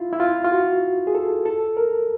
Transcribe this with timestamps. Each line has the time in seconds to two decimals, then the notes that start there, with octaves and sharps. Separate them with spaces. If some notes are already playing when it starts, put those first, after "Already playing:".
Already playing: E4 F4
0.12 E4
0.20 F4
0.44 F4
0.52 F#4
1.07 G#4
1.15 A4
1.46 A4
1.77 A#4